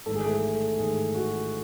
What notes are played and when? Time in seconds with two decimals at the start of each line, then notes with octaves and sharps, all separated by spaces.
0.06 A1 G#2 D#3 A4
0.15 G#4
0.25 A3 A4
0.78 A1 G#2 D#3 G#4
1.14 F#4